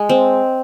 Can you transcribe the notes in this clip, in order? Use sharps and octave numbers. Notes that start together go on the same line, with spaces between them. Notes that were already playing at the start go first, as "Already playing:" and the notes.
Already playing: G#3
C4